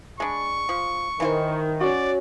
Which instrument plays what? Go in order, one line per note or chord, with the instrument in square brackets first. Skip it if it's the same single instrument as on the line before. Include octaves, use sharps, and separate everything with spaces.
[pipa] G#3 D4 [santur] B5 [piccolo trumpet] C#6
[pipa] F3
[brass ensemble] D#3 [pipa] E3 F4 C5
[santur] C#4 F#4 [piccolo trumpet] D5